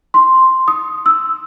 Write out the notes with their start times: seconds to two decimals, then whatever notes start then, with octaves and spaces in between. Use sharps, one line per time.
0.14 C6
0.68 D#6
1.06 E6